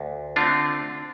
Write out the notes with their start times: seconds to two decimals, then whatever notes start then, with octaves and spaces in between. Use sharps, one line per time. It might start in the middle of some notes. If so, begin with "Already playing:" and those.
Already playing: D2
0.36 D3 A3 C4 D4 F4